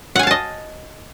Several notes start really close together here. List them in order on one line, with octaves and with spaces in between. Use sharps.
F#5 G#5 F5 A5 D#5